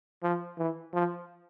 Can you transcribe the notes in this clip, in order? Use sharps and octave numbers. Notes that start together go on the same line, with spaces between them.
F3
E3
F3